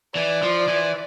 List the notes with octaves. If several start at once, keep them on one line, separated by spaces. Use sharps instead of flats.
E3 D5
F3
E3